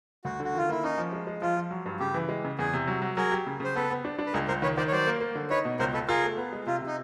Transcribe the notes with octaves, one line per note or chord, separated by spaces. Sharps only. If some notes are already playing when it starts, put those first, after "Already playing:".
D2 F#4
D3 F#4
D#3 F4
A#3 E4
C#4 D#4
F3
G#3
G#3
F3 F4
F3
F#3
G2
C#3 G4
E3
G#3
C#3
E2 G#4
C3
F#3
F#3
F#3 G#4 A#4
G4
C#3
C#3 C5
B3 A4 B4
B3
D4
D4
B4
C#2 G#4 A#4
C#2 A#4 C5
D#3 B4 C#5
D#3 C5 D5
C#5
F#3 C5 D5
A#3
A#3
D3
D#4 B4 C#5
B2
C#2 A#4 C5
C#2 A4 B4
F4 G#4 A#4
A3
B3
G#3
C3 F4
C3 D#4